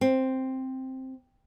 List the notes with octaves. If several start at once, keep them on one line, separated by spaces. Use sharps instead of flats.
C4